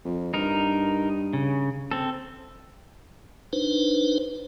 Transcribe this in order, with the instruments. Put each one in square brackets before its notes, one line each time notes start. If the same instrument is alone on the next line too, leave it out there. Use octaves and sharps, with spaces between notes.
[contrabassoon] F2
[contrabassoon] G2 [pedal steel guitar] D#4 A#4
[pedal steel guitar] C#3
C4 A4
[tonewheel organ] D4 D#4 B4 C5